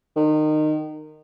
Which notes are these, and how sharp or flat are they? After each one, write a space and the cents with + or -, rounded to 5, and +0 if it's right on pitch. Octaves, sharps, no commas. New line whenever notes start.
D#3 -25